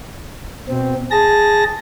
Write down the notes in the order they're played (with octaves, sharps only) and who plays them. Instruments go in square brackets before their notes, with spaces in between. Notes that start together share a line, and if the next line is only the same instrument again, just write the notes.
[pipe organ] B2 C4
G#4 A5 A#6